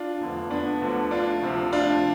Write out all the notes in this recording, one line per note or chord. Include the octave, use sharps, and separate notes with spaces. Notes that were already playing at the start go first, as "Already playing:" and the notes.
Already playing: D4 F4
F1 E2 D3 F3
B3 D4
D2 D3 F3
D4 F4
D2 C3 F3
D4 F4